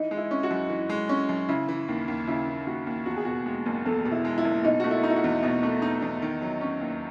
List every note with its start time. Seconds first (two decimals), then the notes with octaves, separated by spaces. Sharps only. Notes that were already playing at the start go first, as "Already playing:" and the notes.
Already playing: E3 D#4
0.11 G#3
0.17 E4
0.31 C#4
0.43 F#4
0.51 F#2
0.70 E3
0.90 G#3
1.09 C#4
1.29 F#2
1.49 C#3 E4
1.69 E3
1.88 D#2
2.08 D#2
2.27 C#3 E4
2.47 E3
2.67 D#2 F#4
2.87 D#2
3.06 E2 F#4
3.17 G#4
3.25 B2 F#4
3.46 G#3
3.66 F#1
3.85 E2 A4
4.05 B2
4.12 E4
4.25 G#3
4.38 E4
4.45 F#1
4.64 B2 D#4
4.80 A3 F#4
4.91 E4
5.03 D#4
5.10 E4
5.16 F#4
5.24 E2
5.42 B2 D#5
5.63 A3
5.82 D#4
6.02 E2
6.22 D#3
6.42 F#3
6.61 C#4
6.81 D#2